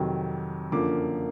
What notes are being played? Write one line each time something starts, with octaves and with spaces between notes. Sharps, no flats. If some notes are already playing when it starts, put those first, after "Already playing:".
Already playing: F2 C3 D#3 F#3
F#2 D3 F3 A#3 D6